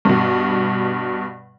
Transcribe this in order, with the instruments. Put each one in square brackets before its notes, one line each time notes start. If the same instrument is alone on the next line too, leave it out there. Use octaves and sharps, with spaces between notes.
[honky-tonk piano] G2 B2